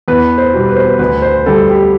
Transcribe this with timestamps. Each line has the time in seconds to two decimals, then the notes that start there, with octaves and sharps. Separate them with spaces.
0.08 E2 B4
0.38 C5
0.54 B2 G3
0.69 B4
0.76 C5
0.85 B4
0.99 D2 B4
1.22 C5
1.46 D3 G3 A4
1.69 G4